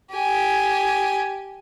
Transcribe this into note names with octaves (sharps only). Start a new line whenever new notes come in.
G4 G#5